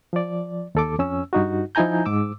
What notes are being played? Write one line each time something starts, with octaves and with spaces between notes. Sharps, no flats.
F3 D5
D#2 A4 D6
F2 C#4 E6
G2 D#4 F#4
F3 D#4 E4 G#5 A#5 G6
G#2 D6 E6